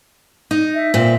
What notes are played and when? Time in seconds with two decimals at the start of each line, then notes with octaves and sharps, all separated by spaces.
0.51 D#4
0.74 E5
0.94 A#2 C4